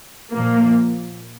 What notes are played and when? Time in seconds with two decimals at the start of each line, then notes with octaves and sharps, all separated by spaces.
0.32 A#2 F3 A#3